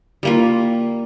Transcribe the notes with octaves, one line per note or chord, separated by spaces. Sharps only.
G3 A#3 F4